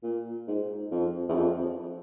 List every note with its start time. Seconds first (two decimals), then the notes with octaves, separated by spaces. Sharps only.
0.03 A#2
0.48 G#2
0.91 F2
1.29 E2
1.34 F2